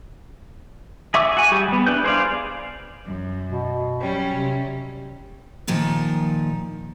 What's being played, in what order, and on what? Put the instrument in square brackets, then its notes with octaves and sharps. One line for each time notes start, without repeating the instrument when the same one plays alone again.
[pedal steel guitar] G#4 E5 C#6 D6 E6
F#4 G#5
G3 G4 G#4
G3 B3
D4 E4 B4 G6
G#4 C5 D5 F5
[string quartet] F#2
[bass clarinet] B2
[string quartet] F#3 G3 C#4
[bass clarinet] C3
[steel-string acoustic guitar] A#2 D#3 F3 D#4